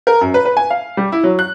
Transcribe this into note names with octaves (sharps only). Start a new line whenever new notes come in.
A#4
F#2
B4
B4
G#5
F5
G3
E4
F#3
F#6